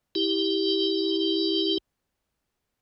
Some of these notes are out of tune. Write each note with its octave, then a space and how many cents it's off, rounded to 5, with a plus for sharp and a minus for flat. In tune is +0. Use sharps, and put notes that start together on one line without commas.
E4 -20 G4 +0